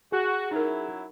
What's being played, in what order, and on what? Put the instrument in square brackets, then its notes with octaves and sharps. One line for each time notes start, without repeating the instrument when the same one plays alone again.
[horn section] F#4 [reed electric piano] G#4
[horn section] F#3 C#4 E4 [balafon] D#4 A#4